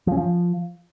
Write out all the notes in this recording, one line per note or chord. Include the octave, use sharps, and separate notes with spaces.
F3
C#4
F3